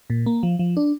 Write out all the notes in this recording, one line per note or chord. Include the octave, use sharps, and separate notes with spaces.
A#2
A#3
F3
F3
D4